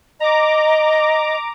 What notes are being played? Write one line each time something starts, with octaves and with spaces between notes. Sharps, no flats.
D#5 A#5 D6